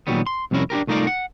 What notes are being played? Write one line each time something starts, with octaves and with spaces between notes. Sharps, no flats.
A#2 D#3 F#3 G3 B3
C6
C2 F2 C3 C#4 E4 A#4
D4 F4 G4 A#4
C2 A3 D#4 F4 A#4 D5
F#5